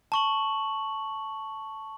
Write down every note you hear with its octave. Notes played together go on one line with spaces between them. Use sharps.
A5 C#6 F#7